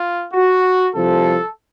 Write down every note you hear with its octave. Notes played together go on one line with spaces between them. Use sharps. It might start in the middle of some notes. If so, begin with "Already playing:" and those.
Already playing: F4
F#4
C2 C3 F3 A4